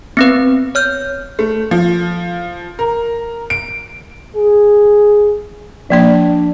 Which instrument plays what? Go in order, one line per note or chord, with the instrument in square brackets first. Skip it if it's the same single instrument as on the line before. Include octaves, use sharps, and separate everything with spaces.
[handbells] B3 C4 B4
C#5 F6 G6
[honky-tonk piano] A3
F3
A#4
D7
[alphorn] G#4
[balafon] F3 A#3 D5 [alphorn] D4